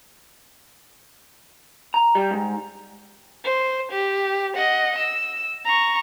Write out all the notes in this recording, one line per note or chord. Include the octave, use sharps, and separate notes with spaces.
A#5
G3
G#2
C5
G4
D#5 F#5
E6
A#5 C#6